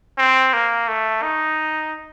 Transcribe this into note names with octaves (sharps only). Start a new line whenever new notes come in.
C4
A#3
A3
D#4